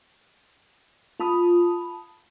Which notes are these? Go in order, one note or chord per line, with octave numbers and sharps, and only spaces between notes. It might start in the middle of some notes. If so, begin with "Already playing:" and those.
F4 A5 B5 D#6